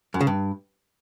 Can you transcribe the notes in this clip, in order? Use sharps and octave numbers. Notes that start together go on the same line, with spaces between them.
F#2
C#3
G2